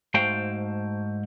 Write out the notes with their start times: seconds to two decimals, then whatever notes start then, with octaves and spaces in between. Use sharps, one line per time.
0.14 G#2 A3 F#4 C5 F5 G5